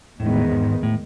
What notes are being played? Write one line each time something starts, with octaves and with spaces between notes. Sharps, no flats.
E2 A2 D#3 G#3 B3
G#2
A2